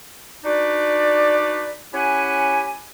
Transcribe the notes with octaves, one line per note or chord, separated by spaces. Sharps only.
D4 D#4 F#4 B4 D5
C#4 E4 G4 F#5 G#5